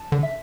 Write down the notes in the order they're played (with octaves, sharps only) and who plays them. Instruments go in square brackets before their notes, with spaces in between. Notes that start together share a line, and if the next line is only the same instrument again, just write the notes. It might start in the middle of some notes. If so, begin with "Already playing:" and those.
Already playing: [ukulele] A5
[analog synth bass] D3
[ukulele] E5